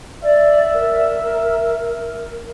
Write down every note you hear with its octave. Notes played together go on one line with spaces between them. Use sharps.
D5 E5
A#4